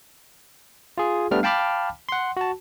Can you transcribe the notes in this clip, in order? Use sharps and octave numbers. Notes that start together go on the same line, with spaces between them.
F4 G#4
G3 A3 B3 D4 F6
F5 G5 A5 B5 D6 F6
F#5 C6
F#4 A5